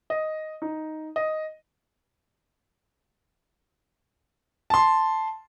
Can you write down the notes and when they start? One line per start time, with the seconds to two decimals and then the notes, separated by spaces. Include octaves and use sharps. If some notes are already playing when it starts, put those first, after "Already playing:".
0.10 D#5
0.62 D#4
1.16 D#5
4.70 A5 C6